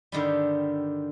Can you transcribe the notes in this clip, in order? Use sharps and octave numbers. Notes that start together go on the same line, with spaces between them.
G2 D3 D#3 G3